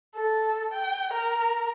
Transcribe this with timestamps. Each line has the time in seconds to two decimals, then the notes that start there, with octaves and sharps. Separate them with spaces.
0.15 A4
0.72 G5
1.13 A#4